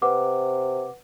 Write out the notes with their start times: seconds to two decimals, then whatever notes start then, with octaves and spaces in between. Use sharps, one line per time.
0.02 C3 B4 F#5 D6